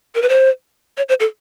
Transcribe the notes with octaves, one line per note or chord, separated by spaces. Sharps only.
A#4
B4
C5
C#5
C5
A4